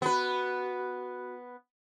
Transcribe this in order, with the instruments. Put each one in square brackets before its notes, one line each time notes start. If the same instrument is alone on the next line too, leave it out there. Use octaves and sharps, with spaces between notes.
[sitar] B3 B4 [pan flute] F#4